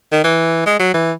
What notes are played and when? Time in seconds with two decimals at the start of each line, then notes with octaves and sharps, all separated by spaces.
0.12 D#3
0.24 E3
0.66 G#3
0.80 F#3
0.94 E3